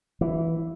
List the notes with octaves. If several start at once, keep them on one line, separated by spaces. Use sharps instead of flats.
E3